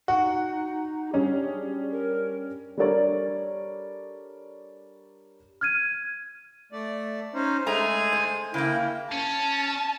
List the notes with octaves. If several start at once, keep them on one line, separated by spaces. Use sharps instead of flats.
D#4 F#4 F#5
G3 C#4 D4 G#4
A#4
G3 D4 A4 A#4 C#5 D5
F6 G#6 D#7
A3 D5
C#4 D#4 C5
G#3 A3 G#4 G#5 A#5
C5
C#3 A#3 E4 G5
C#4 A5